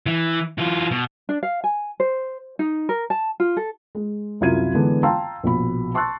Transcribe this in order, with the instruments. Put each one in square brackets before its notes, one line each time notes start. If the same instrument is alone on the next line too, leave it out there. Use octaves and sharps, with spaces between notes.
[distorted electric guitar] E3
E3 F4
B2
[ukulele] D4
F5
G#5
C5
D#4
A#4
A5
F4
A4
[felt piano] G#3
C2 F#2 E4 F4 G#6 D#7
D3 E3 G#3 B3 D4
F5 G5 A5 A#5 C6 E6
A#1 B2 B5
A5 C6 C#6 E6 F#6 A6